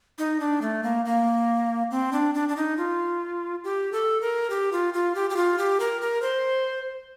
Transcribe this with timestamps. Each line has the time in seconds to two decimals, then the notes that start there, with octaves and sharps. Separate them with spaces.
0.18 D#4
0.40 D4
0.62 A3
0.83 A#3
1.05 A#3
1.91 C4
2.13 D4
2.34 D4
2.48 D4
2.57 D#4
2.78 F4
3.64 G4
3.92 A4
4.21 A#4
4.50 G4
4.72 F4
4.94 F4
5.15 G4
5.30 G4
5.36 F4
5.58 G4
5.80 A#4
6.01 A#4
6.22 C5